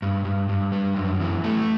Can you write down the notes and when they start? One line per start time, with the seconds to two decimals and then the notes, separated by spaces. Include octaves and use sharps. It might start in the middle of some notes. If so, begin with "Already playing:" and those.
0.02 G2
0.25 G2
0.49 G2
0.72 G3
0.96 F#2
1.20 E3
1.44 A3